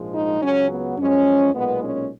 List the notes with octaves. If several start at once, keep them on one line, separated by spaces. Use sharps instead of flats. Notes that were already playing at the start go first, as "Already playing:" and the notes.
Already playing: A#1 G#2 F3 G#3
D#4
C#2 C#3 F#3 C#4
B3
F#2 F3 G#3 C#4
B1 A#2 G#3 B3
C#4